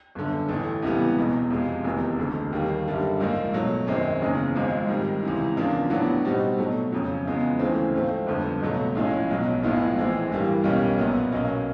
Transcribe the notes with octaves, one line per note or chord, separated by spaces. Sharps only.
G1 F#2 D3
A1 A2 E3 A3
C#2 C3 E3 G3 B3
E1 E2 B2
F2 C3 F3 G#3
F1 E2 C3 D#3
E1 D2 D3
D#2 D#3 G3 A#3
F#2 D3 G3 A#3 D4
A#1 G#2 F3 A#3 D#4
B2 F#3 A3
G#1 F#2 D#3 G#3 C4
F#1 E2 C#3
G#1 G#2 F3 G#3 C4
G#2 D#3 G3
C#2 C3 E3
E2 C#3 F3 A#3 D4
A2 F#3 B3 D4 F#4
B2 G3 C4 D#4 F#4
B2 F#3 A3
F2 C#3 F#3
E2 C#3 F3 G#3 B3
D2 C#3 E3 A3 C4
G#2 F3 A3 C4
G1 F2 D3
C#2 B2 F#3 A3
A#1 A2 F3 G#3 C#4
B1 B2 F#3
A#1 A2 F3 G#3 B3
A#1 A2 E3 G#3 C4
G2 E3 G3 A#3
B1 B2 G3 A#3 C#4
A#1 A#2 F#3 B3
B1 B2 F#3 A#3 C#4